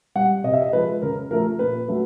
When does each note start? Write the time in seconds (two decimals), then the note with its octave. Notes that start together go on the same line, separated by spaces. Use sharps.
0.15 G3 F#5
0.44 C3 D#5
0.53 E5
0.62 D#5
0.73 F3 G#3 B4
1.02 C#3 A#4
1.31 F3 A3 A#4
1.59 A#2 B4
1.88 F#3 A3